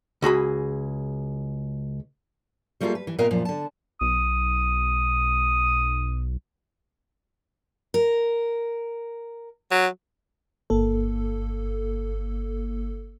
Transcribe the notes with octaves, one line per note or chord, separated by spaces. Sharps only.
C#2 F#4 G#4 B5
G3 A3 A#3 F4 G#4 A4
B4
E3
A#2 B3 A#4 D#5 F5
F#2 A#2 F3
D3 A5
B1 D#6
A#4
F#3
G1 A#3 A4